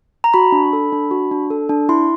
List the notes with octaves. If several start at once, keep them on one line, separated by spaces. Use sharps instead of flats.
A#5
F#4 B5
D4
A4
D4
F#4
D4
A4
D4
E4 C6